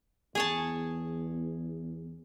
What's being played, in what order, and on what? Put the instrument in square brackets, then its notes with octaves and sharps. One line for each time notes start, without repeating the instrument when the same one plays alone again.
[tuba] E2 [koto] G#4 C#5 A5